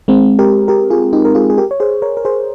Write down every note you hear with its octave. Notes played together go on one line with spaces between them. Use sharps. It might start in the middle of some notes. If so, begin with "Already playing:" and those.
G#3 C4
G4 A#4
G4 A#4
F4 G#4
D#4 G4
A#4
F4 G#4
G#4
G4 A#4
C#5
G#4 C5
A#4 C#5
A#4
G#4 C5